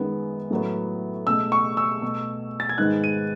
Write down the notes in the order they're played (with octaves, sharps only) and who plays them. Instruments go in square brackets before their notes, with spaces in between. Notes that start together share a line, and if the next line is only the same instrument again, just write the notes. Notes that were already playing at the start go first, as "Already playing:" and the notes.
Already playing: [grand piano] F#2 D#3 G#3 B3
A2 F#3 B3
C#2 B2 A3 E6
C#6
E6
B2 A3
A6
G#6
G#2 D#3 G#3 B3 F#6
D#7